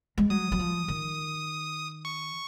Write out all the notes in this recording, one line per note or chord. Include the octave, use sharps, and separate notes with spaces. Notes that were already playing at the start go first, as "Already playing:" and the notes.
G#3
F#3 D#6
F#3
F3
D#3
C#6